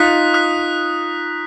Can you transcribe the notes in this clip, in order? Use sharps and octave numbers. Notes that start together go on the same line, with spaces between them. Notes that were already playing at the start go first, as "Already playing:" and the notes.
Already playing: D#4 F4 D#6 F#6 B6
D#6 F#6 B6